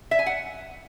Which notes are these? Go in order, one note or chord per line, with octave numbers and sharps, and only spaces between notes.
E5
G#5
F#5